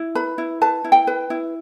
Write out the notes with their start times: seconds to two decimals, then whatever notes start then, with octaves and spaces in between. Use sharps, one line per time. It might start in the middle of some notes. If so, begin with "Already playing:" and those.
Already playing: E4
0.15 B4 B5
0.38 E4
0.61 B4 A5
0.84 E4
0.92 G5
1.07 B4
1.30 E4